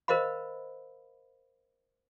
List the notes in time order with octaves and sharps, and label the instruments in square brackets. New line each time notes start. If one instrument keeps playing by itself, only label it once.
[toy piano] A#4 C5 D#5 F5 B5